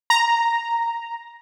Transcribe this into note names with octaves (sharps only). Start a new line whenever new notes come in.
A#5